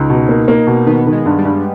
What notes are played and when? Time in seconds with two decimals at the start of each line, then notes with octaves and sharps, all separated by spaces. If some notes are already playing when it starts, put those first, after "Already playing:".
Already playing: C#2 D#4
0.10 B2
0.29 A#3
0.48 A#3
0.67 B2
0.86 D#3 B3
1.06 D#3
1.12 G#3
1.26 G2
1.38 G3
1.45 G2